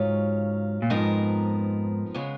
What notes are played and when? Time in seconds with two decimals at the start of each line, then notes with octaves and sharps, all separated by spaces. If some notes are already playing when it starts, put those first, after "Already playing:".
Already playing: D#2 G#2 C#3 F#3 C#4 F4
0.82 A#2
0.90 F2 G#2 F3 B3 D#4 A#4
2.14 C#3 G#3 B3